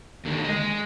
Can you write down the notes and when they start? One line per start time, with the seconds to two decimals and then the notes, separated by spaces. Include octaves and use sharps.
0.25 D#2 D3
0.44 G#3 D#5